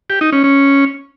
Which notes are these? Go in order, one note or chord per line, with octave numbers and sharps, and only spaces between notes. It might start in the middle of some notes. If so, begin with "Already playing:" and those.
G4
D#4
C#4
C#4